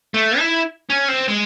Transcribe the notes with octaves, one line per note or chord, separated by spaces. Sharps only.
A3
E4
C#4
C4
G#3